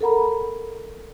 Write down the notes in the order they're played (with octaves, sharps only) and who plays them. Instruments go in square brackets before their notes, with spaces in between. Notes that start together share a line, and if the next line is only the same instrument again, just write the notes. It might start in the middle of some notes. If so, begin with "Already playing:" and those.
[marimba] A4 A#4 F#5 A#5 B5